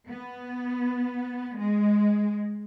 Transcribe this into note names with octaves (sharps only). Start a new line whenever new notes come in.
B3
G#3